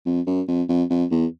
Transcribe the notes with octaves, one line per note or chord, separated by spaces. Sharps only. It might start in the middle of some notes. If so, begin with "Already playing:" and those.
F2
F#2
F2
F2
F2
E2